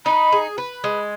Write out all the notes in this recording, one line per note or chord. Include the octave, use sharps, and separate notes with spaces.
D#4 B5
G#4
B4
G#3